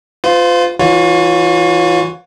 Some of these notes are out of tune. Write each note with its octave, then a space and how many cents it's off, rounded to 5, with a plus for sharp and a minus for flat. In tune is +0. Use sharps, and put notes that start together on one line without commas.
F4 +5 C5 -45
E3 +0 F4 +40 C#5 +15